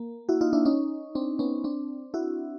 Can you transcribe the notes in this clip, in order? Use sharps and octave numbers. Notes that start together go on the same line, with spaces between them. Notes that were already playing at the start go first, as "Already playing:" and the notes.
Already playing: A#3
E4 F#4
D#4 F4
D4 E4
C#4 D#4
C4 D4
B3 C#4
C4 D4
E4 F#4